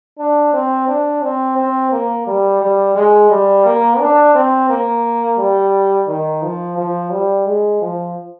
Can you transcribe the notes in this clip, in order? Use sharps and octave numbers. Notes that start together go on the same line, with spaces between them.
D4
C4
D4
C4
C4
A#3
G3
G3
G#3
G3
A#3
D4
C4
A#3
G3
D#3
F3
F3
G3
G#3
F3